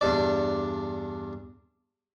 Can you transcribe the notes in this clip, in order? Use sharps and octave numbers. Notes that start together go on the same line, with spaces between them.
E2 G2 D4 D5